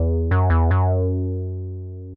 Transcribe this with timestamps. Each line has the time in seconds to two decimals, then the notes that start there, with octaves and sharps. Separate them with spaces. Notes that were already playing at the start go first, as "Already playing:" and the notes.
Already playing: E2
0.31 F#2
0.50 E2
0.71 F#2